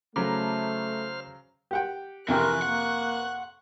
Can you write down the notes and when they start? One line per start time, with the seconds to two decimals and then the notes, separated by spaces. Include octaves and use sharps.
0.16 C#3 F#3 A3 C5 A#5 B5 D6 F6
1.71 G4 F#5 G5
2.28 F2 C3 E3 A#4 G5 C#6 F#6
2.62 A#3 F#5